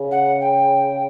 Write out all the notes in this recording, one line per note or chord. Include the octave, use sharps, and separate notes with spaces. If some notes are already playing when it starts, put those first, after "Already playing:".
Already playing: C#3
F#5
G5